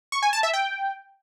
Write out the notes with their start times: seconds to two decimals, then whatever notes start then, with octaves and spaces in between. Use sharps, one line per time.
0.12 C#6
0.23 G#5
0.33 A5
0.43 E5
0.53 G5